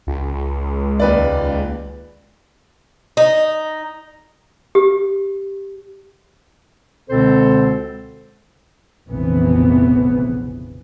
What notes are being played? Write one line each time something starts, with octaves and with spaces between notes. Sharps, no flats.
C#2
D#2 B4 D5
D#4
G4
C#2 B2 D3 C4 A4 C5
F1 A#1 F2 C#3 E3 B3